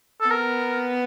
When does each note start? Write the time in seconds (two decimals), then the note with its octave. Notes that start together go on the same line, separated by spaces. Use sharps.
0.21 A4
0.29 B3 A#4